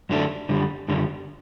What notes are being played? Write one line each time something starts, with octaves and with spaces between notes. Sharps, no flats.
F#2 D3 F#3 A3 D4
F#2 D3 G3
F#2 D3 G3